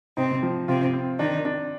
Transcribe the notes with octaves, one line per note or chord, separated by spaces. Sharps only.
C3 C4 D#4
F3
C3 C4 F4
C4
D#3 D4 D#4
D4